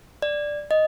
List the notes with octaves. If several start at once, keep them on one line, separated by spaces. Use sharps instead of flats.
D5
D#5